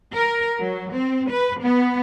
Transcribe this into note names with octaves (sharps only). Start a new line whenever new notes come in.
A#4
F#3
C4
B4
B3